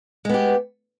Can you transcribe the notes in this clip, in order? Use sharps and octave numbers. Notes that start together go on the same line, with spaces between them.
G#3 B3 G4